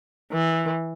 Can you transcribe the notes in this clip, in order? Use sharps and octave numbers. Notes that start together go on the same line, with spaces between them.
E3